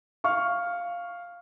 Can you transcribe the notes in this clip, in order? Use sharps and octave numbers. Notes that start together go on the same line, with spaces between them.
F5 C#6 F6